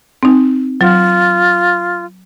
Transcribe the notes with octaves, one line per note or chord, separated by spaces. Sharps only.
C4 D#4
F#3 F4